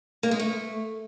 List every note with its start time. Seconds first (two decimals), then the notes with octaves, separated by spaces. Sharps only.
0.23 A#3
0.31 G#3
0.39 A3